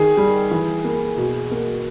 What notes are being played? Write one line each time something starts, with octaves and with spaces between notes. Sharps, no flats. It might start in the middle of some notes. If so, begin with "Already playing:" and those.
Already playing: D#3 G#4
G3
E3
A#3
B2
A#3